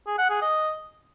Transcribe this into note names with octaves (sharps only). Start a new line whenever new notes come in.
G#4
F#5
G#4
D#5